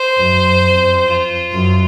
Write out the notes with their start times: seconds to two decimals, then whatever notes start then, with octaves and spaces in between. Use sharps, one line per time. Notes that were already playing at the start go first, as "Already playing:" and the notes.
Already playing: C5
0.18 F#2
0.62 F2
1.07 F4
1.52 F#2